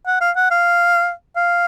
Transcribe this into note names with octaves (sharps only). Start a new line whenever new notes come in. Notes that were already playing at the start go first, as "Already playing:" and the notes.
F#5
F5
F#5
F5
F5